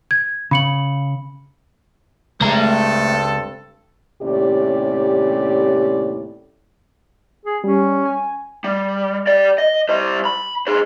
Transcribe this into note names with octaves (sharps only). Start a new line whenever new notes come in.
G#6
C#3 B5 C#7 F#7
C#2 G2 G#3 A3 C4 A4 A#5
D#2 A2 C3 C#4 G4 D5
G#4
G3 C#4
G#5
G3
G4 D5
D#5
G3 C5
B5
G#4 C5